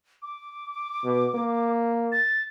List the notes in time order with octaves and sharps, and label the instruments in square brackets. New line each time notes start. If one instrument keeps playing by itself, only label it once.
[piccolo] D6
[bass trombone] B2
A#3
[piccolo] A6